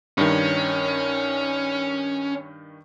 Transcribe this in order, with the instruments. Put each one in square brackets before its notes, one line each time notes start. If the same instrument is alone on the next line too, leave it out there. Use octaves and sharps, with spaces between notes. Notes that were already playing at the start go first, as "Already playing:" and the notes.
[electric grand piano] G2 D#3 [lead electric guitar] C#4